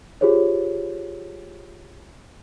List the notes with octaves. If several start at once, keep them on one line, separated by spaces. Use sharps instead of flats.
F4 G4 G#4 C5 C#5